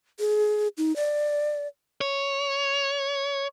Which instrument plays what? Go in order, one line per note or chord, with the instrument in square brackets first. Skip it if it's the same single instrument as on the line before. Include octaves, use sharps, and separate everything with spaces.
[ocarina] G#4
D#4
D5
[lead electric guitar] C#5